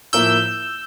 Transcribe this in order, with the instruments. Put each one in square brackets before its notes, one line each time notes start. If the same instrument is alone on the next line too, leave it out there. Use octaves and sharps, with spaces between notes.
[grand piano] A2 F3 A#3 E4 [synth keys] E6 G6